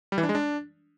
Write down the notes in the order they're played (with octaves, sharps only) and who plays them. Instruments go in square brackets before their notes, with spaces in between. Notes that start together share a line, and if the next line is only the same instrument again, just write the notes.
[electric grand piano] G3
E3
D4
G#3
D4